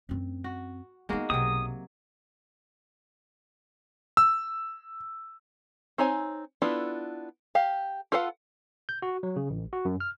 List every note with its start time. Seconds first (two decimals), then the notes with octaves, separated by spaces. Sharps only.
0.09 F#2 C4
0.44 F#4
1.09 G#3 A#3 B3 D#4 F#4
1.30 B1 C3 F#3 D#6
4.17 E6
5.98 C4 D#4 C#5 G#5
6.62 B3 D4 E4 F4 A4
7.55 G4 F5
8.12 F4 A4 B4 F5 F#5
8.89 G6
9.02 F#4
9.23 F#3
9.36 C#3
9.50 A1
9.73 F#4
9.85 F#2
10.00 F6